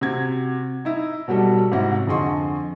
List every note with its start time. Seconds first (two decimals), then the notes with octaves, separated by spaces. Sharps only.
0.01 C3 F#4 G#6
0.85 D#4 E4
1.28 B2 F#3 G3 F#4 A4
1.72 G#2 C3 F#3 E4 F#4
2.07 F2 D3 G#4 D#5 C6 C#6